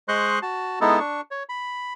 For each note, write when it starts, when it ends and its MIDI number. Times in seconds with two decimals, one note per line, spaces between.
0.08 0.39 56
0.08 0.39 72
0.08 0.39 75
0.08 0.39 84
0.08 0.39 85
0.08 0.39 90
0.42 0.79 66
0.42 0.79 81
0.81 0.99 56
0.81 0.99 59
0.81 0.99 63
0.81 0.99 64
0.81 0.99 69
1.00 1.21 62
1.00 1.21 85
1.31 1.43 73
1.49 1.93 83